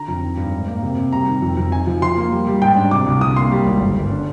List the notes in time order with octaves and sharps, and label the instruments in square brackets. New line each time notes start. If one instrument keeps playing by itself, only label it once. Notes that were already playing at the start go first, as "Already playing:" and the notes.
Already playing: [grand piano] D3 A#5
F2
D#3
G2
G#2
A#3
C3
C3
G3 A#5
D#3
F2
F2
D#4 G#5
F3
F3 C6
A#3
G3
G3
G#2 G5
D4
C3 D6
C2
D3 D#6
A#3 C6
G3
G#1
G1
G1
D4